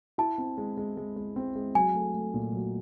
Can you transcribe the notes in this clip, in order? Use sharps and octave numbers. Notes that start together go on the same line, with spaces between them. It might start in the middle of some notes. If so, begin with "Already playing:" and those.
E4 A5
C4
G#3
G#3
G#3
G#3
C4
G#3
F#3 G#5
A3
A3
A#2
F#3